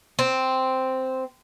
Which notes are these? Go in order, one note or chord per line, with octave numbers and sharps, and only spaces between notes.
C4